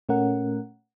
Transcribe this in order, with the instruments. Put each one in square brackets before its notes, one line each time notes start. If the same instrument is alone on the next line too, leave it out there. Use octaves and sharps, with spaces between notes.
[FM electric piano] A#2 A3 C#4 A#4 F#5